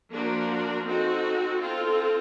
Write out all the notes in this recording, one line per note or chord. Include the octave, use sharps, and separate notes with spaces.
F3 A#3 D4 F#4 A#4
C4 D#4 F#4 A4
C4 F4 A4